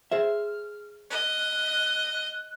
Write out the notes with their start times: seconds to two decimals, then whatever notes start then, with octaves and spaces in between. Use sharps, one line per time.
0.12 G#4 C5 E5 F6
1.11 D#5 F#6